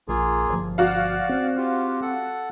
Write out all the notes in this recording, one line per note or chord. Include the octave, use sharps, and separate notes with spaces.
A#1 A#3 F4 G#4
G1 F3
F#4 D5 F5
C4
F4 G4
A4 F#5